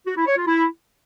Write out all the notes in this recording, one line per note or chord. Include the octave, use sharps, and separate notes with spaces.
F#4
E4
C#5
F4
E4